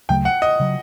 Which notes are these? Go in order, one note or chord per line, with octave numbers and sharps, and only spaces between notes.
D2 C#3 F#3 A3 G5
F#5
D#5
C#3 F#3